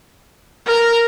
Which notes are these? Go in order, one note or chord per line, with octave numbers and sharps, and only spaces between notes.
A#4